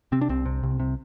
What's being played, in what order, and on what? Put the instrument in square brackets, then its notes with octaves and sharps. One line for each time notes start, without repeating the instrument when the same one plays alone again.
[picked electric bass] C3 C4
D4
C2 C4
C3
C2
C3